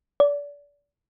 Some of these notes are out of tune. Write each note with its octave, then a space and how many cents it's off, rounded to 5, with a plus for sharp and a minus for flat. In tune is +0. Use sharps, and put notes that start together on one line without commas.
D5 -30